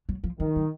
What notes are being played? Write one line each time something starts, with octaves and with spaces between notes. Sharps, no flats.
F#3
F3
D#3 F3
F#3